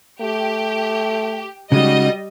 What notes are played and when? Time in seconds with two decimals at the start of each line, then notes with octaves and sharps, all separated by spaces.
0.21 A3 G4
1.72 C#3 G3 G#3 D#4 F#4 D#5